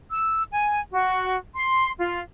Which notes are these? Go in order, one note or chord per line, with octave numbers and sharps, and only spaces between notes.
E6
G#5
F#4
C6
F4